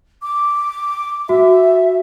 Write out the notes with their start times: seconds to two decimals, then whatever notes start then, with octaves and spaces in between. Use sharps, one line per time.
0.21 D6
1.29 F#4 E5